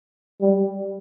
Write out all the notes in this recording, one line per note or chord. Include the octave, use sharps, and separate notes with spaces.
G3